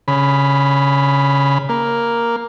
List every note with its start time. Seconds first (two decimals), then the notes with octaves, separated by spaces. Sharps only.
0.08 C#3 B5
1.69 A#3